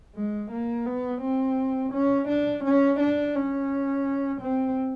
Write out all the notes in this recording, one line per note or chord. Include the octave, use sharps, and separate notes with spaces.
G#3
A#3
B3
C4
C#4
D4
C#4
D4
C#4
C4